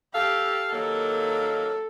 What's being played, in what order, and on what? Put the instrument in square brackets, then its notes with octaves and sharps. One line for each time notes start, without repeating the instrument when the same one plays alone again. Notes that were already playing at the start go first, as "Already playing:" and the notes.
[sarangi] G4 [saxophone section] A4 F5
[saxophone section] D#3 F#3 A#3 [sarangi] A4